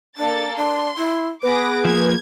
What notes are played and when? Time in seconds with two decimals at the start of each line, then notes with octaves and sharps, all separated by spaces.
0.17 A#3 D4 A4 A6
0.56 D4 C6
0.97 E4
1.43 B3 G#4 B4 D6 A#6
1.85 F3 A#3 G#6